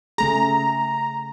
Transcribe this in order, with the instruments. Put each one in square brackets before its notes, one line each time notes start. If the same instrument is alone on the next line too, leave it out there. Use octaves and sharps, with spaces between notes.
[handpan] C#3 A3 G#4 [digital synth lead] A#5